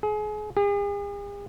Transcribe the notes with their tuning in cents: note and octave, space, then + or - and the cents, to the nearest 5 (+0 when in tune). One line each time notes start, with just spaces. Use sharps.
G#4 +30
G#4 -45